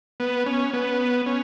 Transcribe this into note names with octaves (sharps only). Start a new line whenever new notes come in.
B3
C#4
B3
C#4